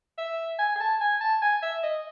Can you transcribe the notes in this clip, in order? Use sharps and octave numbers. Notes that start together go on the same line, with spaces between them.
E5
G#5
G#5
A5
G#5
A5
G#5
E5
D#5